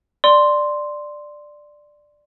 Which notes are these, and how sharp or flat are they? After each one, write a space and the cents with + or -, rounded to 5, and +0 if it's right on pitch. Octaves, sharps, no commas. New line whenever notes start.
D5 +10 C6 +0